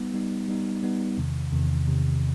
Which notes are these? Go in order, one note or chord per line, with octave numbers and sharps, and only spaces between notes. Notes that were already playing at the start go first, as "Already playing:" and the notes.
Already playing: G3 B3 D#4
G3 B3 D#4
G3 B3 D#4
G3 B3 D#4
E2 C3 D#3
E2 C3 D#3
E2 C3 D#3